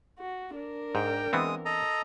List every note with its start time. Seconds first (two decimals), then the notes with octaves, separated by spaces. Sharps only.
0.19 F#4
0.56 D4 A#4
0.95 G#2 G5
1.33 E3 G#3 B3 C4 D#6
1.65 A4 D#5 A#5